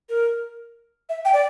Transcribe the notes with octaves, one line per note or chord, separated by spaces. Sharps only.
A#4
E5
G5
D5